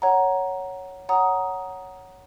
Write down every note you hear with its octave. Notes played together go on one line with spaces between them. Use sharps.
C#5 F#5 A#5
C#5 F#5 A#5 D#6